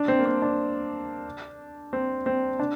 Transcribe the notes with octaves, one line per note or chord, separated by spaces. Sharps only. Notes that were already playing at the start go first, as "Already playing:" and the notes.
Already playing: D4
C4
A#3
C4
D4
C4
C4
D4